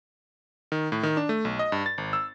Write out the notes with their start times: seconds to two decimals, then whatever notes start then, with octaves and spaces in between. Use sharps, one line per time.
0.72 D#3
0.92 A2
1.03 D#3
1.17 D4
1.29 A3
1.45 B1
1.59 D#5
1.72 G2
1.86 A6
1.98 G#1
2.13 E6